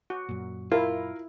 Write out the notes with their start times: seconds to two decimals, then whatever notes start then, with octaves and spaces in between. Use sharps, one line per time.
0.10 F#4
0.29 F#2 A#2
0.72 E4 F4 A#4